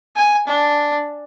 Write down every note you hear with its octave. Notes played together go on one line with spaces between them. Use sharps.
G#5
D4